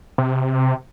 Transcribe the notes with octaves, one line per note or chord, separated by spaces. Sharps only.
C3